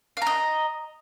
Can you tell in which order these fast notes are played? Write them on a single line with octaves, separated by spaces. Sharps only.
F5 A#5 D#5